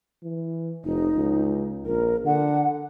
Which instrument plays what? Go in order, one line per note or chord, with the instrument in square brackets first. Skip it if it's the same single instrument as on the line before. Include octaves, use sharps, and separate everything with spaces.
[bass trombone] E3
[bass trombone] F1 [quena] D#4
[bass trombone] C#2
[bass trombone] A#1 [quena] A#4
[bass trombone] D3 [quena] F#5